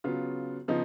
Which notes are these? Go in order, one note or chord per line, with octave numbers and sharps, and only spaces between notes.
C#3 F#3 B3 F4
C#3 F3 B3 D#4